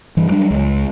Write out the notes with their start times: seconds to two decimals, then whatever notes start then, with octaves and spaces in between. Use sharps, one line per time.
0.17 G2 E3
0.30 F#3 G3 D4
0.51 C#2 G#3